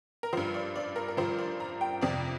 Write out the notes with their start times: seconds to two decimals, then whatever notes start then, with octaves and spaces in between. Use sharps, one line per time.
0.23 A#4
0.33 F3 C5
0.37 G2
0.54 D5
0.76 D5
0.96 A#4
1.08 A#4
1.17 G2 F3 C5
1.38 D5
1.60 A#5
1.81 G5
2.01 F2 C3 F3 D5